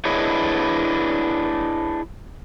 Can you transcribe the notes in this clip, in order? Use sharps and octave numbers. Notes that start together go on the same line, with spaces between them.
D4 E4 G#4 B4 C#5 D#5